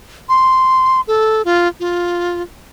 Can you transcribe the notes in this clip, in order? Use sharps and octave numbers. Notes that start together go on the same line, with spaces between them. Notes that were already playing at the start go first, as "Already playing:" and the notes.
C6
A4
F4
F4